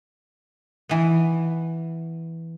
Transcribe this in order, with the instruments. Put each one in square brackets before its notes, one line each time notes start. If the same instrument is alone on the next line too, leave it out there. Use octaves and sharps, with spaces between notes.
[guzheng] E3 B3